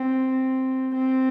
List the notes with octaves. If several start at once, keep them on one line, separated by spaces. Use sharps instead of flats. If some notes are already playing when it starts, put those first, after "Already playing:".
Already playing: C4
C4